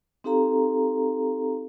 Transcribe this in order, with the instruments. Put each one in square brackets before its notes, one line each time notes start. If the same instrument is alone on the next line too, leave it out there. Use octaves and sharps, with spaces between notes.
[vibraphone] C4 D#4 G4 A4 F5 A#5